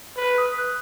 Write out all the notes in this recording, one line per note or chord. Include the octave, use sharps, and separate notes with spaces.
B4
D#6
F#6